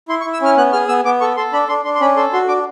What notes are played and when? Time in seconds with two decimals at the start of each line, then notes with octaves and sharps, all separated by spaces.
0.09 E4 C6
0.21 C#6
0.25 E4
0.33 E6
0.41 C#4 F6
0.57 B3 F#6
0.73 G#4 F6
0.88 B3 E6
1.05 B3 D6
1.21 A4 C#6
1.37 A4 C6
1.53 D4 B5
1.68 D4 C6
1.84 D4 C6
1.95 C6
2.01 C#4 B5
2.16 A4 C6
2.33 F#4 C6
2.48 D4 D6